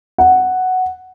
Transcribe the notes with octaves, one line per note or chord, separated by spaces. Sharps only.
F#5